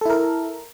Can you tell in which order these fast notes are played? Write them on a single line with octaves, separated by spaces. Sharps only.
A4 E4 A#4